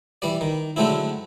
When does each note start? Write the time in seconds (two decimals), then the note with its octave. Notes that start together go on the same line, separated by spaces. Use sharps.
0.22 E3 G3 D5
0.41 D#3
0.76 D3 F#3 G#3 A3 C4 E4